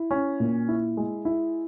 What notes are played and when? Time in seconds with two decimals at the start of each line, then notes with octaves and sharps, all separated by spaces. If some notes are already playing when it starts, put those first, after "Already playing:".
Already playing: E4
0.11 C#4
0.40 A#2
0.68 E4
0.97 G#3
1.25 E4